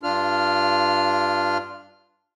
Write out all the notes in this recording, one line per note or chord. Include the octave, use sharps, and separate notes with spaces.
G2 D4 F4 F6